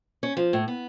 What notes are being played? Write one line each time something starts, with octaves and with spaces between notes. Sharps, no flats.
C#4
F3
A2
B3